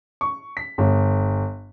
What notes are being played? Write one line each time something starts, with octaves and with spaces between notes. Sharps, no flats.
C#6
B6
G1